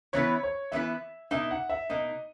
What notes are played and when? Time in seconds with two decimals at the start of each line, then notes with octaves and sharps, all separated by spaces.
0.13 E3 B3 E4 B4 C#5
0.43 C#5
0.72 E3 B3 E4 B4 E5
1.31 B2 A#3 D#4 E5
1.51 F#5
1.70 E5
1.90 B2 A#3 D#4 D#5